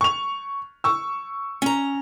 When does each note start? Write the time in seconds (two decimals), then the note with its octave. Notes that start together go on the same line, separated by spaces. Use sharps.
0.01 C#6 F7
0.84 C#6 E6
1.62 C#4 A#5